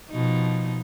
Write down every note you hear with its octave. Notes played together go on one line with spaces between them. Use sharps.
B2 F3 D#4